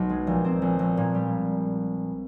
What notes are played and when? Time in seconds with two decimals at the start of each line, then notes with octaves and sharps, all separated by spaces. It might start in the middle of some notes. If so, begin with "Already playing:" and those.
Already playing: B1
0.10 G#3
0.27 A#1
0.44 C4
0.62 A#1
0.79 A#1
0.97 A#2
1.14 G3